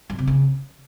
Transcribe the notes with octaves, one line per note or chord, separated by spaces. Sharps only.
G2
C3
C#3